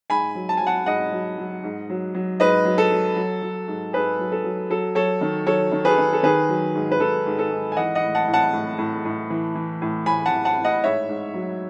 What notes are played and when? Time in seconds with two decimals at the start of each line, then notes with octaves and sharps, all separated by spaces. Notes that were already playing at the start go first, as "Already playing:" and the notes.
0.10 G#2 G#5 B5
0.35 F#3
0.49 A5
0.57 F#3 G#5
0.67 F#5 A5
0.86 G#2 D#5 F#5
1.12 F#3
1.38 F#3
1.63 G#2
1.90 F#3
2.15 F#3
2.40 G#2 B4 D#5
2.65 F#3
2.78 A4
2.92 F#3
3.16 F#3
3.42 F#3
3.68 G#2
3.93 G#2 G#4 B4
4.19 F#3
4.32 A4
4.44 F#3
4.70 F#3 A4
4.95 F#3 A4 C#5
5.21 D#3
5.47 F#3 A4 C#5
5.72 D#3
5.85 G#4 B4
5.98 D#3
6.13 A4
6.23 D#3 G#4 B4
6.49 F#3
6.75 G#2
6.92 B4
6.99 D#3 A4
7.26 G#2
7.39 A4
7.51 G#2
7.72 G#5
7.76 E3 D#5 F#5
7.95 D#5 F#5
8.02 A2
8.15 F#5 A5
8.28 A2
8.34 F#5 A5
8.53 A2
8.78 A2
9.05 A2
9.30 E3
9.55 E3
9.82 A2
10.06 A2 G#5 B5
10.26 F#5 A5
10.32 E3
10.45 F#5 A5
10.58 A2
10.64 D#5 F#5
10.83 G#2 C#5 E5
11.09 G#2
11.34 F#3